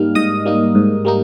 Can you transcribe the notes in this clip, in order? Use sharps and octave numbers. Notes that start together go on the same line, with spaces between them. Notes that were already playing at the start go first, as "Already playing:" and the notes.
Already playing: G#2 G3 A#3 D#4 F6
G#2 D#5 D#6
G3 A#3 D#4
G#2
G3 A#3 D#4